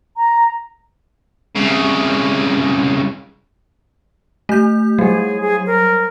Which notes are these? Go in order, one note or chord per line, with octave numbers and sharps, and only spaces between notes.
A#5
C2 C#3
A3 G6
F#3 G3 G#4
G#4
A#4